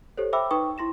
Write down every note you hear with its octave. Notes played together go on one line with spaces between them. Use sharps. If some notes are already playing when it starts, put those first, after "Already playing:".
G4 A4 C5 C#5
C5 E5 G5 B5 D6 E6
D#4 B4 G5 C#6 D#6
E4 C6 A#6 E7